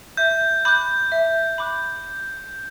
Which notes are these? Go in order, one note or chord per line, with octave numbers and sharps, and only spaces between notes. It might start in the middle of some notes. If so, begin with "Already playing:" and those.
E5 G6
B5 D6 F#6 G6
E5
B5 D6 F#6